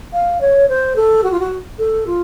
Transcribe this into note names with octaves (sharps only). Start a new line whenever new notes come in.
F5
C#5
C5
A4
F#4
F4
F#4
A4
F4